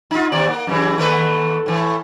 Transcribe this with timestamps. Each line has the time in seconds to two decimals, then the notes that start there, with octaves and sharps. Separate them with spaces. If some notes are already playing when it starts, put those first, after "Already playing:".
0.11 D#4 F4
0.32 D#2 C3 D5
0.49 A#3
0.67 F#2 C#3 E3
0.98 D#2 A3 B4
1.66 A2 E3